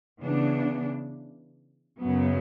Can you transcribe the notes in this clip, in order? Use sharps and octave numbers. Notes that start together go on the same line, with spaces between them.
C#3 E3 B3 D4
F#2 C#3 F#3 B3